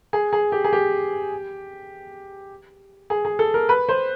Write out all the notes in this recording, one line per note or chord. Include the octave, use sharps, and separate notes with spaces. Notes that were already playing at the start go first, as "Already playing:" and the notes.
G#4
G#4
G4
G#4
G4
G#4
G#4
A4
A#4
B4
C5